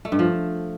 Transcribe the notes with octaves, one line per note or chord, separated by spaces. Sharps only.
A3
G2
F3